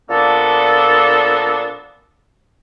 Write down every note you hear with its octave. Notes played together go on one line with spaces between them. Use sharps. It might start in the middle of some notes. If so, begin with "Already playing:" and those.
A#2 F3 A#3 B3 D4 A4